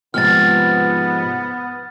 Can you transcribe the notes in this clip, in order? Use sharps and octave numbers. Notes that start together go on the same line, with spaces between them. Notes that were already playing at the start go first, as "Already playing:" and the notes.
G#2 C3 F3 B3 F6 A6